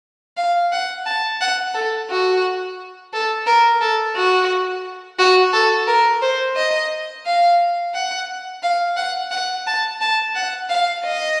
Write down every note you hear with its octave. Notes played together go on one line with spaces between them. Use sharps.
F5
F#5
A5
F#5
A4
F#4
A4
A#4
A4
F#4
F#4
A4
A#4
C5
D#5
F5
F#5
F5
F#5
F#5
A5
A5
F#5
F5
D#5